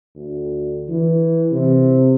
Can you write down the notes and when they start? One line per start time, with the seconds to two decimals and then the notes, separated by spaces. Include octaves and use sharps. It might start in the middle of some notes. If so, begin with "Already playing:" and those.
0.15 D2
0.89 E3
1.52 C3